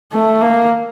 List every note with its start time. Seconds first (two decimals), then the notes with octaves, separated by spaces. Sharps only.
0.12 A3
0.41 A#3